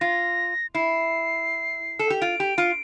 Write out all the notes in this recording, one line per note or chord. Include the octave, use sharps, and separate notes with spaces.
F4 A#6
E4 C7
A4
G4
F4 D7
G4
F4